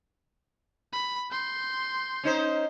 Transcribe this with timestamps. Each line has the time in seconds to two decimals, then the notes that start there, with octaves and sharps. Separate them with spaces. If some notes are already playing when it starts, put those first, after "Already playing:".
0.93 B5
1.31 C6 G6
2.24 C#4 D#4 C5